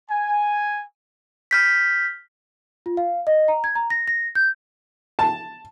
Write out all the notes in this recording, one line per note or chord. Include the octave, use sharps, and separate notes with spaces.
G#5
F6 G6 B6
F4
F5
D#5
A#5
G#6
A#5
A#6
A#6
G6
A5